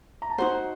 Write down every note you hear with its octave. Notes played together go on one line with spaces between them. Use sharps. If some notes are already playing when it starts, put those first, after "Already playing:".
A#5
A5
D#4 F#4 C5 F#5